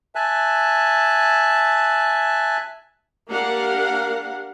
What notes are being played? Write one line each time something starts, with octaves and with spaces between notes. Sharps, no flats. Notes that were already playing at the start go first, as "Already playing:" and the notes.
E5 G#5 A5 F#6
A#3 D4 G4 A#4 F5 F#5